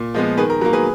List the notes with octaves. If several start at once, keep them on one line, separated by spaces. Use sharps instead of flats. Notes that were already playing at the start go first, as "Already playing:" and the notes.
Already playing: A#2
F3 G#3 B3
D#3 G#4 B4
A#4
F#3 A#3 A#4
G#4 B4